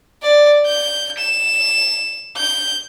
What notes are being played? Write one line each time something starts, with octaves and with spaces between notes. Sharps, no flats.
D5
G6
E7
G6